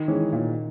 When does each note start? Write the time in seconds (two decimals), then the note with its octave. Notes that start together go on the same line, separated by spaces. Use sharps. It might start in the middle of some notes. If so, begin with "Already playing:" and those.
Already playing: D#3
0.08 E3 G#3 C#4
0.33 A#2